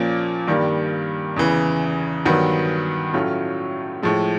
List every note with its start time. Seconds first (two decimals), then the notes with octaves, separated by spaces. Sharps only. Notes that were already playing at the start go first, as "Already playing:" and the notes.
Already playing: A#2 F3 A#3 C#4
0.47 G2 D#3 G3 A#3
1.36 E2 C#3 E3
2.25 G2 D#3 F#3 B3
3.13 A2 F#3 A3 C#4 F4
4.03 A2 F3 G#3